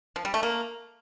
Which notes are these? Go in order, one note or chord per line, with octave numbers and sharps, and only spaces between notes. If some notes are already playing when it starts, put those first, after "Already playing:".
F3
G3
A3
A#3